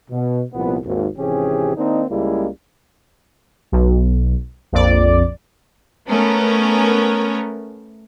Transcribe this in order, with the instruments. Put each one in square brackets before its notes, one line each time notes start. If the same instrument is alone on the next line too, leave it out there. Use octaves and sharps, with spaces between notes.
[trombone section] B2
C2 A#2 F3 B3
G#1 D#2
G#1 C3 E3 C#4 G4 G#4
D#3 A#3 C4 D4 D#4
C#2 C#3 G3 G#3 A#3 E4
[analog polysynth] B1
A#1 F2 D5
[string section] A3 B3 C#4 A#4